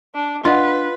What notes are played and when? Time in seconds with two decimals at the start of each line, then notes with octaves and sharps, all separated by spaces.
0.15 D4
0.45 D4 F4 B4 D#5 F#5